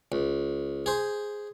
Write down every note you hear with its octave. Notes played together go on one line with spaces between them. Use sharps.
C#2
G#4 C5